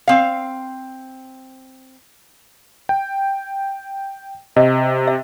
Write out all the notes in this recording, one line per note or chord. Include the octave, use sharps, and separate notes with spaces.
C4 F5
G5
C3 D#5
E5